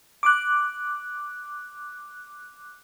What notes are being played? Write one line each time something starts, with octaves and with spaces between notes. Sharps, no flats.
D6 F#6